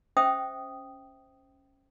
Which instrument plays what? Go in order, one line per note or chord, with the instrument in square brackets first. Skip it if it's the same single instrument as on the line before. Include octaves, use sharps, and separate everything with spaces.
[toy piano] C#4 C5 E5 G5 D#6